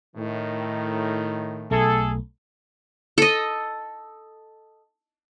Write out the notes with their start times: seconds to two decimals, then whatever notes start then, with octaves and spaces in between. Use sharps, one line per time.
0.16 A2 D#3
1.71 B1 A3 G#4 A4
3.18 A4 D#5